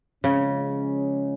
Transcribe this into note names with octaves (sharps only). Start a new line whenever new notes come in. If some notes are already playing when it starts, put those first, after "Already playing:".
C#3 F3 G#3 C#4